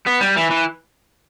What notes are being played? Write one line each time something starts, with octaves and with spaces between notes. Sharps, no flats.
B3
G3
E3
E3